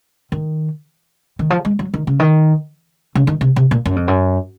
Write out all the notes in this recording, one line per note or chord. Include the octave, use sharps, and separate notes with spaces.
D#3
D#3
F3
G#3
F#3
D#3
C#3
D#3
C#3
D#3
C3
C3
A#2
F#2
F2
F#2